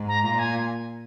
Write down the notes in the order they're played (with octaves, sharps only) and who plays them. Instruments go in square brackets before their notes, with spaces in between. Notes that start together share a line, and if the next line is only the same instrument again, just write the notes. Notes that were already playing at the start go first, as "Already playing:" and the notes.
Already playing: [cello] G#2
[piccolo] A#5
[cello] A#2 [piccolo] A#5
[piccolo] G#5